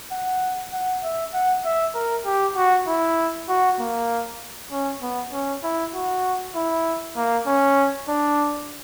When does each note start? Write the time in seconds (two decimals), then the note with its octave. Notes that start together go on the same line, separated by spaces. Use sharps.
0.12 F#5
0.73 F#5
1.03 E5
1.34 F#5
1.65 E5
1.95 A#4
2.25 G4
2.56 F#4
2.88 E4
3.49 F#4
3.80 A#3
4.71 C#4
5.02 B3
5.32 C#4
5.63 E4
5.94 F#4
6.56 E4
7.17 A#3
7.47 C#4
8.08 D4